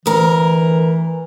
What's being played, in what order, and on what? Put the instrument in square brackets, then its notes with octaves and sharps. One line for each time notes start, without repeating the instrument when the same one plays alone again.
[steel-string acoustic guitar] D2 A#4 [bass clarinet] E3